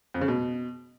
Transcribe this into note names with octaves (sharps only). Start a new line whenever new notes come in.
F2
C#3
B2